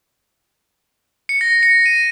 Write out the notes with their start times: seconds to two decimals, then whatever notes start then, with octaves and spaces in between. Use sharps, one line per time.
1.29 C#7
1.41 A#6
1.63 C#7
1.86 D#7